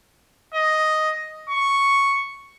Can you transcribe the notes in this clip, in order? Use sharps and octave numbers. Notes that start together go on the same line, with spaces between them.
D#5
C#6